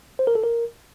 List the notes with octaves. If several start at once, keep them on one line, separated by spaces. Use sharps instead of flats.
C5
A#4
A4
A#4